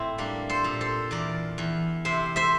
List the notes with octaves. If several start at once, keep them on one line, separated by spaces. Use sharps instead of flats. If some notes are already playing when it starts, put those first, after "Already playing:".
Already playing: A2 C4 E4
G3 A#3 D4
A4 C5
A#2
A4 C5
E2 A#4 D5
E2
C3 C5 E5
C5 E5